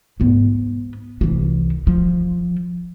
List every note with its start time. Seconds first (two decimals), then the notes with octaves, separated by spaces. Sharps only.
0.20 G#2 B3
1.21 C2 E3
1.87 F3